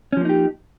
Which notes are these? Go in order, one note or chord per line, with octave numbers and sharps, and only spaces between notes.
F3 A#3 C#4 D#4 G4